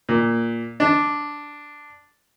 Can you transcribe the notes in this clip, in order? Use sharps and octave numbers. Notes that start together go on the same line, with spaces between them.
A#2
D4